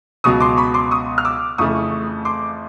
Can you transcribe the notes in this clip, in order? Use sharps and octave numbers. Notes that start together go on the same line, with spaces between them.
C#2 B2 F#3 C#6 D#6
C6 D6
B5 C#6
C6 D6
C#6 D#6
F6
D6 E6
F2 C#3 E3 A3 C#6 D#6
C6 D6